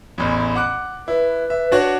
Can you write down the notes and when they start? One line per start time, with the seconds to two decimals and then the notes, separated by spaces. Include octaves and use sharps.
0.18 A1 E2
0.55 F#5 D6 F#6
1.08 E4 B4
1.50 E5
1.72 D4 F#4 C#5